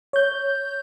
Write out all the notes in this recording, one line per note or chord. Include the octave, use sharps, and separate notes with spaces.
C#5 G6